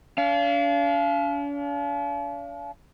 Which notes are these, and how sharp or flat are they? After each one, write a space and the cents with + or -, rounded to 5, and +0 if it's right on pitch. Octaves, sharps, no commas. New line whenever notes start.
D4 -45 F5 -25